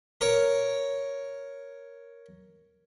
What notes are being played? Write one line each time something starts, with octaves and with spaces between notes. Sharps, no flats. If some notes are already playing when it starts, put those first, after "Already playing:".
A#4 C#5